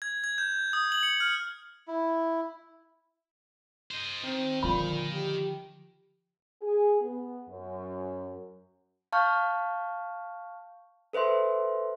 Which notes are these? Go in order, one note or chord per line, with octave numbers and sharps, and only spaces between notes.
G#6
G#6
G6
D#6
F#7
C#7
F6
E4
C5 D#5
D#3 C4
A#2 D3 F3 B5
G4
G#4
B3
F#2
F5 A5 C#6 F6 G6
A4 B4 C5 E5 C6